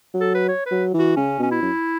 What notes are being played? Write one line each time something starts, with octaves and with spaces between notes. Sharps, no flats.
F#3
A4
B4
C#5
B4
F#3
E3
F#4
C#3 C#4
B2 C#4
E4
F#2